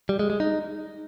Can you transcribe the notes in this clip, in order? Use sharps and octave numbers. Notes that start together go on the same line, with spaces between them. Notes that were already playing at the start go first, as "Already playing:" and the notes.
G3
G#3
G#3
D#4